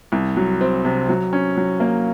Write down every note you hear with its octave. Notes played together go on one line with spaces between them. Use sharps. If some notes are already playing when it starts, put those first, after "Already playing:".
C2
F#3
C4
C3
F#3
C#4
F#3
A#3